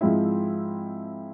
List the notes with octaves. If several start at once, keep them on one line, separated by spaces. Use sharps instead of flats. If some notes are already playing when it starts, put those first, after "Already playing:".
G#2 F3 G#3 C4 E4